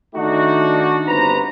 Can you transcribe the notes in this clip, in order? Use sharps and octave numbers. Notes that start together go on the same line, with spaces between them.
D#3 A3 D4 D#4 F#4
G1 C4 B4 C5 A#5